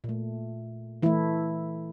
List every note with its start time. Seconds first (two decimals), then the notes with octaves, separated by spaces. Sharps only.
0.04 A#2
0.09 A3
1.02 E3 A3 E4